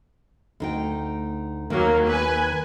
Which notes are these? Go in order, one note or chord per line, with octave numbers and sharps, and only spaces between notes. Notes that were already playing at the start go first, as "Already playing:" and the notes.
D2 D#4 G5
D#2 D#3 F#3 A#3
B4 G#5